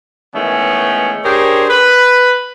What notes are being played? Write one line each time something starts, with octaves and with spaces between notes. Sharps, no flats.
D#3 E3 G#3 A3 B3 C#4
D4 G4 G#4 A#4 C5 C#5
B4 B5